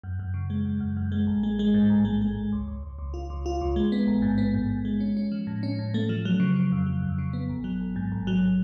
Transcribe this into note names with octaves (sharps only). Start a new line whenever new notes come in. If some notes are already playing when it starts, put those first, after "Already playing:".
F#2
F#2
C#3
G#3
F#2
F#2
F#2
G#3
A1
G#3
G#3
G#2
A1
G#3
G#3
A1
C#2
C#2
C#2
C#2
F4
C#2
F4
C#2
G#3
B3
A1
G#2
B3
G#2
G#2
G#3
C#4
C#4
F3
A2
C#4
A2
A3
F3
F#3
C#3
C#3
F2
F#3
F2
C#3
B3
A1
F#3
A1
G#2
A1
F#3